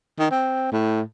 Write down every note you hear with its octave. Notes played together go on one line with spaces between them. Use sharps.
D#3
C4
A2